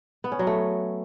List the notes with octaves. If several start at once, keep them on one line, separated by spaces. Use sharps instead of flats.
B3
C#4
F#3
A3